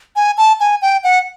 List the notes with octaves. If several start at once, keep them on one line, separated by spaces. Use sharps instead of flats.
G#5
A5
G#5
G5
F#5